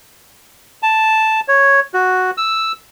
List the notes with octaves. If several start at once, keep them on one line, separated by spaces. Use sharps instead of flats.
A5
C#5
F#4
E6